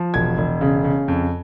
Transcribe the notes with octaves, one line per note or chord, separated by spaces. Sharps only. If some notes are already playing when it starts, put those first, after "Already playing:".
Already playing: F3
E1 G#6
E1
C#3
C#3
F2